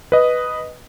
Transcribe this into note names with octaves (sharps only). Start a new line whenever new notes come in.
B4 D#5